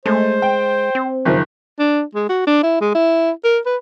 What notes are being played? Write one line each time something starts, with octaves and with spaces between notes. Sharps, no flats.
G#3 A3 C5
G5
C4
F#1 D#3 F3
D4
G#3
F#4
D4
E4
G#3
E4
A#4
B4